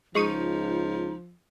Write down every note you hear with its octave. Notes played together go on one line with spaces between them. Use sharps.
C#2 F3 G#3 D#4 C#6 D#7